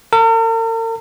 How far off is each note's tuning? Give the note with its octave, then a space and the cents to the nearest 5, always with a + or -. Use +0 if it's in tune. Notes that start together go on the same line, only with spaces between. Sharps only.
A#4 -45